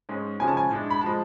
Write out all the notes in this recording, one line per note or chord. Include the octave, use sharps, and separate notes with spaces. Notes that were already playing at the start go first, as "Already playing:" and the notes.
G#2 G#3 C#4
C#3 F3 G#3 C#4 G#5
A5
G#5
A2 G#3 D4
B5
F3 G#3 A5